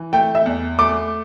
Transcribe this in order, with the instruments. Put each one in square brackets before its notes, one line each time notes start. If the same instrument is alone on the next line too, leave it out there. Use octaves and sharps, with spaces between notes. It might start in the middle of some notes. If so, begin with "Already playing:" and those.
Already playing: [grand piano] E3
[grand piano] A3 [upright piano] G5
[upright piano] E5
[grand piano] E2
[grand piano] A3 [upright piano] D6